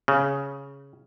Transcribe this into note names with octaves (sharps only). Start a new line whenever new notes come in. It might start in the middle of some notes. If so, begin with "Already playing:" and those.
C#3